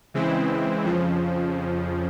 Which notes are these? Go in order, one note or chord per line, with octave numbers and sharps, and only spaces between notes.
C#3 E3 G#3 C4 E4
F2 C#3 F3